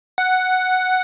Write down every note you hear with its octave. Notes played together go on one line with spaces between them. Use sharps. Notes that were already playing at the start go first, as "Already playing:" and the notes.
F#5